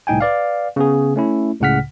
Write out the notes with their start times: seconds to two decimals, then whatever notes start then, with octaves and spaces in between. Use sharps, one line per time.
0.07 C2 A2 D#4 G5 G#5
0.21 B4 D5 F5
0.76 C#3 B3 G#4
1.16 A3 C#4 E4
1.60 C#2 A2 C#3 F#5 F6 B6